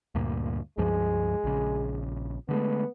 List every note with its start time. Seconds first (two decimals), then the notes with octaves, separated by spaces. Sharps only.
0.15 D2 G2 A#2
0.78 C#2 G2 F3 G#3
1.44 A#1 C#3
2.49 D3 G#3 A3 B3